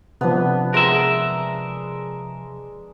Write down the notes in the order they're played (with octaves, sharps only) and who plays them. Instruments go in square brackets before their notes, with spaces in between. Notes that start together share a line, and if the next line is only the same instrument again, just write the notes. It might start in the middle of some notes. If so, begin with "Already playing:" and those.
[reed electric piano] C3 F3 [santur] B3 D4 B4
[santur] G#3 A#5 [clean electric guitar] A#4 E5